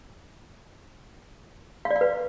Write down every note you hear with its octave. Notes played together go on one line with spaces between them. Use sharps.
F5
D5
F5
B4